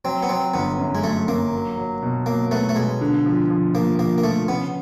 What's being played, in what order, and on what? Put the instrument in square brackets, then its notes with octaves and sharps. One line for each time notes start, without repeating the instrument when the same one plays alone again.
[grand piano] F#3 [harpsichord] C4
[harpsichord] B3
[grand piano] F#3 [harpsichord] C4
[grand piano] G1 [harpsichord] B3
[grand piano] F#2
[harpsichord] G#3
[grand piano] F#3 [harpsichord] A3
[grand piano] F#2 [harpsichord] A#3
[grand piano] F#3
F#3
B2
[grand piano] F#3 [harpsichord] A#3
[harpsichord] A3 [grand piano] B3
[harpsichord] A3
[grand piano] B2 [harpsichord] G#3
[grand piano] D3
F3
F3
[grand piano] F3 [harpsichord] A#3
[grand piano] F3 [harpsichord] A#3
[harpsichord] A#3
[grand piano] F3 [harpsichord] A3
[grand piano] C#3 [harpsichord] B3